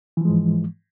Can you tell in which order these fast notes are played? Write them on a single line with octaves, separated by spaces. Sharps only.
E3 F3 G#3 G#2